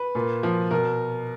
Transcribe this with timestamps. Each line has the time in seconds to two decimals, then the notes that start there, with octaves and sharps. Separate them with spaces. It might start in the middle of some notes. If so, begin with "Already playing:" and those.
Already playing: B4
0.15 A#2
0.43 F3
0.71 B2 A#4